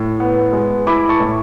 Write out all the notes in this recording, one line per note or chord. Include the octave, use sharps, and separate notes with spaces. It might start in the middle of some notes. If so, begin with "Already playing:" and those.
Already playing: A2
B3
G#3
E4 B5 D6
A5 C#6
A2